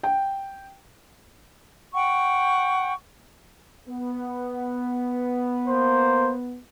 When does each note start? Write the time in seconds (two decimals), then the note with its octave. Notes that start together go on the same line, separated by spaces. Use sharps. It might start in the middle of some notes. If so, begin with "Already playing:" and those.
0.03 G5
1.94 F#5 G5 C#6
3.88 B3
5.67 A#3 C5